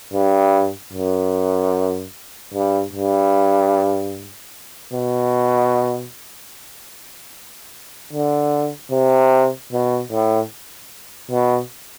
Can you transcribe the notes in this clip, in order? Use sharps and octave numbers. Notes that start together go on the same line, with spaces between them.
G2
F#2
G2
G2
B2
D3
C3
B2
A2
B2